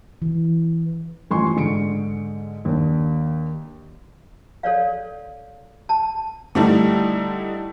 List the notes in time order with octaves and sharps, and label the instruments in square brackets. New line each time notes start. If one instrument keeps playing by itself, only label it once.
[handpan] E3
[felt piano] A1 F3 G#5 C6 C#6
G#2 D3 C#7 D7
D#2 D4
[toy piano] A4 C#5 D5 F5
A5
[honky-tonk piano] D3 G3 A3 D#4 E4